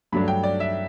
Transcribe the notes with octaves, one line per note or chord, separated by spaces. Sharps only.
G2 F#3 A3 D4 B5
G5
D5
E5